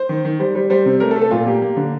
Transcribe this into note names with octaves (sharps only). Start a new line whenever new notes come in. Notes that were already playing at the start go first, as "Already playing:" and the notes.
Already playing: C5
D#3
D#3
G3 C5
G3
G3 C5
C3
A3 A#4
A4
A3
A4
A#2 F4
A#3 G4
A#3
D3